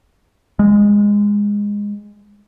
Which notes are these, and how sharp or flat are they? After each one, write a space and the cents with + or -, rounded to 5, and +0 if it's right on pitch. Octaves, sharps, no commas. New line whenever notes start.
G#3 -15